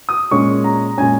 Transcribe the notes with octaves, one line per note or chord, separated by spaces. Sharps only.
D#6
A#2 G#3 C#4 C#6
A#5
A#2 G#3 C#4 G#5